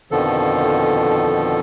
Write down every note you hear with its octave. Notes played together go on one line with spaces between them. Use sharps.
F2 B2 D3 D#3 F3 A4